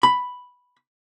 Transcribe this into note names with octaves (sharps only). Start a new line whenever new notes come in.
B5